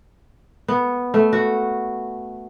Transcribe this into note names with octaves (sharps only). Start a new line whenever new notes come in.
B3
A3
F#4